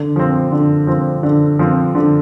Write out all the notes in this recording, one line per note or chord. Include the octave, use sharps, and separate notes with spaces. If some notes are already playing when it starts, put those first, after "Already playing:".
Already playing: D3
F3 C4
D3
F3 C4
D3
F3 C4
D3